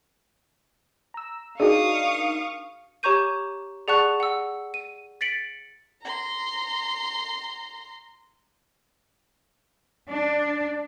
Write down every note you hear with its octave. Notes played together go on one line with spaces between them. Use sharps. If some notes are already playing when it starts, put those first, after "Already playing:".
A#5 E6
D4 D#4 F#4 G#4 A#4 F5 C#6 D#6
G4 C#5 A#5 C#6 G6 D#7
G#4 D5 F#5 A5 C#6 F#6
F#5 E6
D#7
A6 B6 C#7 D7 F#7
A#5 C6
D4